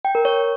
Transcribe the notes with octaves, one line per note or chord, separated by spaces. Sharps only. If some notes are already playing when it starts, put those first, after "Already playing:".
G5
A#4
C#5